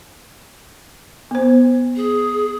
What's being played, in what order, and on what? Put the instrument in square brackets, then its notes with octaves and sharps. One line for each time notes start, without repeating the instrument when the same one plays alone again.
[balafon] B3 C5
[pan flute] G#4